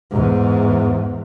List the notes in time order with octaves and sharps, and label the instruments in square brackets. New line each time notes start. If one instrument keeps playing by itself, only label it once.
[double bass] E2 G#2